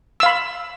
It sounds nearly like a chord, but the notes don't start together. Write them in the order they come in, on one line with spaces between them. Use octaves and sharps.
E6 F5 B5